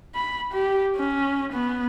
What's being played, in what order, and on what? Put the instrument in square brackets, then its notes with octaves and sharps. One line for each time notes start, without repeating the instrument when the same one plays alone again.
[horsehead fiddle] B5
G4
C#4
B3